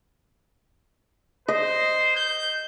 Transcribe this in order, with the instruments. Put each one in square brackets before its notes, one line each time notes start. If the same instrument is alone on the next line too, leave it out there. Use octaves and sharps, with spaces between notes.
[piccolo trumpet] C5 [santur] D#5
[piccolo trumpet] G6